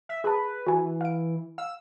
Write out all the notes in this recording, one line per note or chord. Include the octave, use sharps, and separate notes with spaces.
E5
G#4 B4 A5
E3 F#4 G#5
F5 D7
F5 E6